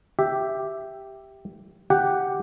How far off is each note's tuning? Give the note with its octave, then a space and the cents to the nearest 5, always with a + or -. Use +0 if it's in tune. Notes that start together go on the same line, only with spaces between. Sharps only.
G4 +0 E5 +0
G4 +0 F#5 +0